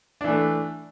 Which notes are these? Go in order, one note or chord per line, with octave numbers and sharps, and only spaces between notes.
E3 A3 D4